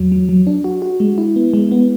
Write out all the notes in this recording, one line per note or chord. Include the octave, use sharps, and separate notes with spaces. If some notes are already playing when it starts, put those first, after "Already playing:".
Already playing: E2 F#3
F#3
F#3
D4
F#4
F#4
G#3
E4
B3
G#3
B3